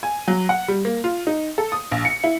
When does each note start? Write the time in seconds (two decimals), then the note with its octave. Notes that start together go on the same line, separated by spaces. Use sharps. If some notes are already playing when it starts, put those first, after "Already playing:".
0.03 G#5
0.28 F#3
0.49 F#5
0.68 G3
0.85 A#3
1.04 F4
1.27 D#4
1.58 A4
1.72 D#6
1.91 A#1
2.05 C#7
2.24 E4